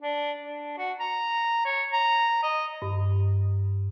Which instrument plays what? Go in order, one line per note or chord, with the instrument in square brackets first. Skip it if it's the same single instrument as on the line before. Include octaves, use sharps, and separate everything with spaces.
[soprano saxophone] D4
D4
F#4
A#5
C#5
A#5
D#5
[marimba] G2